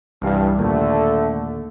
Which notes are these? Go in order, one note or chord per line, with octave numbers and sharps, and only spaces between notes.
C2 G2 E3 F5
D#2 A#2 D3 A3